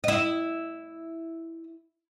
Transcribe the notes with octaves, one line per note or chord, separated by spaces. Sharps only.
E4 D#5